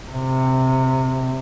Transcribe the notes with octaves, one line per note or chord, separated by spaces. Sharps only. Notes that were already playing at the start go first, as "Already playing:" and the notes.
C3